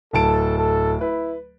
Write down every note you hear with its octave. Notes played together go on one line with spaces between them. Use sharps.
D1 A4 A5 D7
A4
E4 B4